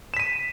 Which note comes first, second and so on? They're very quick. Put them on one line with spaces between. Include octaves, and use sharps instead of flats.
E7 B6 D#7